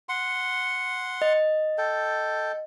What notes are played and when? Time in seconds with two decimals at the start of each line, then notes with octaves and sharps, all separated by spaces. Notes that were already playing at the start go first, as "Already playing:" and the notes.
0.09 F#5 C6
1.22 D#5
1.78 A4 G5